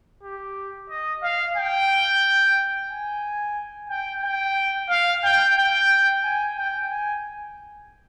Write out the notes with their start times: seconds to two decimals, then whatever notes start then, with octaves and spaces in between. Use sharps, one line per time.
0.23 G4
0.90 D#5
1.23 F5
1.57 G5
2.90 G#5
3.90 G5
4.24 G5
4.90 F5
5.24 G5
5.57 G5
6.24 G#5
6.57 G5
6.91 G#5